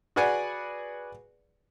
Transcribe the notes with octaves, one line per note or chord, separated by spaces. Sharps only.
F#4 G#4 B4 D5 F#5 G#5